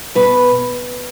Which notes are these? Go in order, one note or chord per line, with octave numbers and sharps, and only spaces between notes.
B2 B4